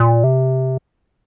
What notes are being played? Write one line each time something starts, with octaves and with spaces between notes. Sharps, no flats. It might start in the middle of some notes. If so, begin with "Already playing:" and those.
Already playing: A#2
C3